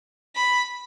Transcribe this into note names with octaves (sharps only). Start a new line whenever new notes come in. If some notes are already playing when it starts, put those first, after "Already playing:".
B5